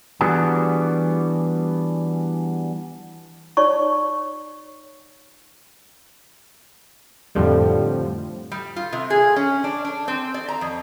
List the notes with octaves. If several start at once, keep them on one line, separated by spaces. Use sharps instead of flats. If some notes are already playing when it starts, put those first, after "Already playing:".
E3 G3 B3 D4 F#4 G#4
D#4 C#5 D5 C#6
F2 A2 D3 F3 G3
G3
F4
C3
G#4
C#4
D4
D4
C4
D5
A#5
F2